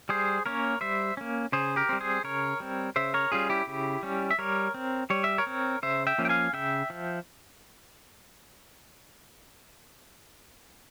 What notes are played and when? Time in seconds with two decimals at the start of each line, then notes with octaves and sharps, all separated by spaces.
0.09 G3 G#4 C5
0.46 A#3 C#4 A#4 C#5
0.81 G3 C5 E5
1.17 A#3 C#4
1.52 C#3 G#4 C5
1.76 G4 A#4
1.89 G3 C4
2.01 G#4 C5
2.24 C#3 A#4 C#5
2.60 G3 C4
2.96 C#3 C5 E5
3.14 A#4 C#5
3.32 G3 C#4 F4 G#4
3.49 E4 G4
3.67 C#3
4.03 G3 C#4
4.31 E5
4.38 G3 A#4 C#5
4.74 C4
5.10 G3 C#5
5.24 E5
5.38 A#4 C#5
5.47 C4
5.83 C#3 C5 E5
6.07 E5 G5
6.18 F3 A#3 C#4
6.25 G5
6.29 F5 G#5
6.53 C#3 E5 G5
6.90 F3